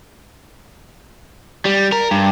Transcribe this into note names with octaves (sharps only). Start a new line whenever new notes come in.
G3
A#4
G2